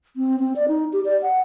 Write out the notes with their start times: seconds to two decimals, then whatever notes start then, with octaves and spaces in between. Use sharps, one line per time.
0.17 C4
0.40 C4
0.56 D5
0.68 D#4
0.93 G4
1.05 D5
1.22 F#5